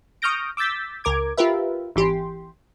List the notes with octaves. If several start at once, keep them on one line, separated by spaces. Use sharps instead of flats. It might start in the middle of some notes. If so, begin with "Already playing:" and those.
C#6 D#6 F6 G6 A#6 D7
D6 E6 G6 A6 B6
C#2 A#4 D6 G#6
F4 G4 A#4 B4 E5
G#1 E3 G4 C6